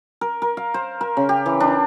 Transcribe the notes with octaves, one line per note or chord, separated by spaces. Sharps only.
A#4
A#4
F5
C5
A#4
C#3
G4
E3
D4